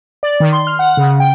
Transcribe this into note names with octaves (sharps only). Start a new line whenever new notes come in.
D5
D#3
C6
F6
F#5
C#3
G5